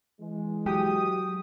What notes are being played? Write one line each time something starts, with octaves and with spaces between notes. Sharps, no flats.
E3 G#3
F#3 G4 D#6